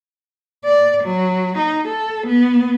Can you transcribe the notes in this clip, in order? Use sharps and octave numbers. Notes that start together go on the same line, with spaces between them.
D5
F#3
D#4
A4
B3